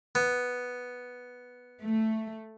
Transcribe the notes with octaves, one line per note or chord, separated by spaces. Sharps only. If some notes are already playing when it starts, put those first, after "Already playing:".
B3
A3